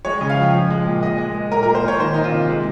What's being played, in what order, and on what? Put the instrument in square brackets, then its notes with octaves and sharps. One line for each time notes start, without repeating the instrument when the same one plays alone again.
[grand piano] G#3 C#5
C#3
F5
F3 G5
F3
G#3
A#2
A#2 D#5
G#3
G#3
A#2 A#4
A#2 A#4
C5
A#2 C#5
D#3 C5
D#3 D#4
F4
C3
G#3